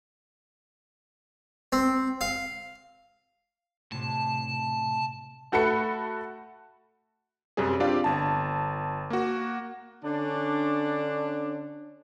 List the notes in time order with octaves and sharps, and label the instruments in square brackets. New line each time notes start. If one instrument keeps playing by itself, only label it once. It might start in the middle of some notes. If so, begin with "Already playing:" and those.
[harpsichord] C4
F5
[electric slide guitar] A2 C3 [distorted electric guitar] A5
[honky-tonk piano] A3 F#4 A4 B5 C#7
[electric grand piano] F#2 C3 G3 C4 G#4
C4 D4 F4 G4 D5 F5
G1 A5
A#3 F#4
[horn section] D3 C#4 D4